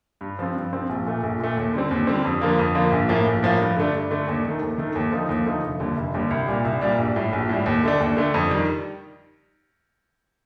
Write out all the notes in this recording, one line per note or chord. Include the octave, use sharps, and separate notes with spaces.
G2
F3 C4
G2
F3 C4
A#1
A#2 A3
A#1
A#2 A3
D#2
D3 G3 C4
D#2
D3 G3 C4
F2
D3 F3 A#3
F2
D3 F3 A#3
A#1
A2 F3 A#3
A#1
A2 F3 A#3
G2
D3 A3 D4
G2
D3 A3 D4
D#2
D#3 A3
D#2
D#3 A3
D#2
D3 F3 A3 D#4
D#2
D3 F3 A3 D#4
F1
D#2 D3 G3
F1
D#2 D3 G3
C2
A#2 G3 D4
C2
A#2 G3 D4
A#1
A2 G3
A#1
A2 G3
D#2
D3 A3 D4
D#2
D3 A3 D4
F2
D#3 G3